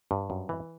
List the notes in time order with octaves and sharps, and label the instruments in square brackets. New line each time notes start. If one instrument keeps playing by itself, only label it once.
[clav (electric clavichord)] G2
F#2
E3